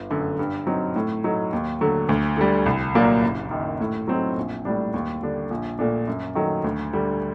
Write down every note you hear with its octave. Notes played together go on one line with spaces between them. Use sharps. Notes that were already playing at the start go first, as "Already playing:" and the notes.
Already playing: G1
F#2 D3 A3
G2
F#3 C4 D#4
A2
F#3 A3 D#4
D#2
D3 F#3 A3
D2
D3 G3
C2
A#2 F#3 A#3 D4
F#1
F#2 D#3
A2
F#3 C4 D#4
A#1
A2 G3 D4
D#2
D3 G3 D4
A#1
A#2 A3 D4
F#2
D#3 F#3 A3
D2
D3 G3